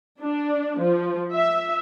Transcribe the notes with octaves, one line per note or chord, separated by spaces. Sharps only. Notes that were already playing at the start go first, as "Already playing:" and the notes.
D4
F3
E5